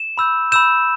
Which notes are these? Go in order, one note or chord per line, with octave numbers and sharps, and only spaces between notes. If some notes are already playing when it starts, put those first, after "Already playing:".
Already playing: E7
B5 E6 G6
B5 E6 G6 E7